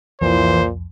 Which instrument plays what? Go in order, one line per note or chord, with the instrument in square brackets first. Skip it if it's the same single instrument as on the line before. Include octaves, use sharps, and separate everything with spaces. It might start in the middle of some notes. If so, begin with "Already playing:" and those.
[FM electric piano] C2 F2 [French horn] A#2 [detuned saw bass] E3 [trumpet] C5